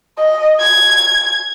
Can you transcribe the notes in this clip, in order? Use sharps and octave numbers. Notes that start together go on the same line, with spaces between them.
D#5
G#6